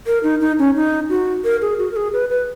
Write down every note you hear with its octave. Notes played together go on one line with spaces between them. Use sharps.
A#4
D#4
D#4
C#4
D#4
F#4
A#4
G#4
F#4
A#4
G#4
B4
B4